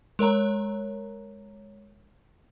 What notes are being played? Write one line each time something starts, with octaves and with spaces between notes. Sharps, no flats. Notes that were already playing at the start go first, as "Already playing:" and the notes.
G#3 A#4 C#5 A#5